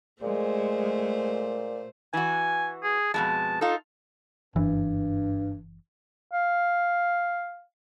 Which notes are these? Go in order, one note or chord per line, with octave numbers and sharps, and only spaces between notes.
A#2 G#3 A3 C5
E3 F#4 G#5
G#4
F2 B2 G#3 A5
D#4 F4 A4
F#1 G2 E3
F5